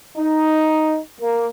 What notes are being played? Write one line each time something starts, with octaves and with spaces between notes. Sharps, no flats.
D#4
A#3